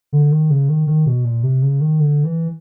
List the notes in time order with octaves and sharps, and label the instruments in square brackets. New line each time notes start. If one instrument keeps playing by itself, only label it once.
[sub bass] D3
D#3
C#3
D#3
D#3
B2
A#2
C3
C#3
D#3
D3
E3